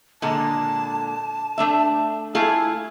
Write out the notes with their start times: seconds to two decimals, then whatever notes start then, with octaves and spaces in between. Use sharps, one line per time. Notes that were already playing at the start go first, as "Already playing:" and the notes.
0.22 A#2 D3 G#3 A5
1.58 A3 D4 E5
2.35 A3 E4 F4 G#4